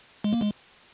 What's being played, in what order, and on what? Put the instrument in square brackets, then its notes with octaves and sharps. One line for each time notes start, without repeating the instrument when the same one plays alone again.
[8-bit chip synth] G#3
A#3
G#3